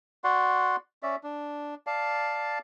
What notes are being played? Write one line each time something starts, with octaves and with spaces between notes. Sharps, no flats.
F#4 D5 F#5 C6
C#4 D5 E5
D4
D5 F5 A5